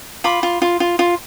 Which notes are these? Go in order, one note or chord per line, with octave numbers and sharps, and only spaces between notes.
F4 B5 D6
F4
F4
F4
F4